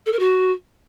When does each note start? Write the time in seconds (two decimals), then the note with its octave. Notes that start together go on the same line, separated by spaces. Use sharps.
0.06 A4
0.13 A#4
0.19 F#4